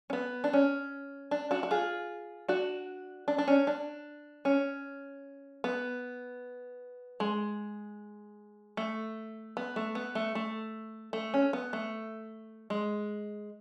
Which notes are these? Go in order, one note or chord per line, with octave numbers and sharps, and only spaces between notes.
C#4
B3
D4
C#4
D4
D4 F#4
F#4
F4 G#4
D4 F#4
D4
D4
C#4
D4
C#4
B3
G#3
A3
B3
A3
B3
A3
A3
A3
C#4
B3
A3
G#3